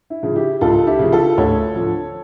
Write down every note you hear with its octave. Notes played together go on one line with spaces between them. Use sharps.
E4
C#3 F3
E4 G4
C#2 F4 A4
E4 G4
C#3 F3
F4 A4
D2 A4 C#5
D3 F3